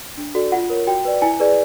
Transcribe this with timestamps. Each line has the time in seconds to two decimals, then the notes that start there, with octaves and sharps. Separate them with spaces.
0.17 D4
0.35 F#4 A4 D5
0.52 F4 F#5
0.70 A#4 C#5
0.87 F#4 G5
1.05 B4 D5
1.22 E4 G#5
1.40 G#4 B4 D5